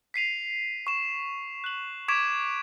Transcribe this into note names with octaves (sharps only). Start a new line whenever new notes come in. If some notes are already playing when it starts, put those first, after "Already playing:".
B6 C7 D#7 F7
C#6 E7
F#6 F#7
C#6 D6 G#6 B6 D7 E7